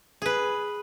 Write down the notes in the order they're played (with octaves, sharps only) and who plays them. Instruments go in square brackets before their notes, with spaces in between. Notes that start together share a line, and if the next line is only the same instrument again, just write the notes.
[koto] G#4 B4